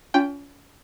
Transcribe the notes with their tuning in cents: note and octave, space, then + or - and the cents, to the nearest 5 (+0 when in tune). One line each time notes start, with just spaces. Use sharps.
C#4 +35 F4 +0 G5 +5